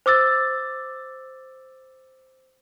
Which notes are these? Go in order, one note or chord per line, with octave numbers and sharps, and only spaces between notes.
C5 D6 E6 A6